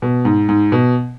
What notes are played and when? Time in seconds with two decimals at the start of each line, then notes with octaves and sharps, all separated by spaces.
0.02 B2
0.25 G#2
0.49 G#2
0.72 B2